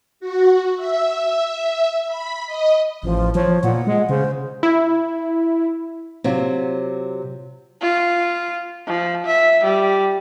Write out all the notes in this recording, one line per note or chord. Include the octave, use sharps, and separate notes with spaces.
F#4
E5
B5
D#5
A1 F3
F3 C#5
A#2 F#5
G#3
C#3 C5
E4
C3 F#3 F4
F4
F3
E5
G3